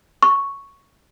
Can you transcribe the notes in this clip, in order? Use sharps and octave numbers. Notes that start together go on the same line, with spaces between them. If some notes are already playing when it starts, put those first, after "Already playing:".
C#6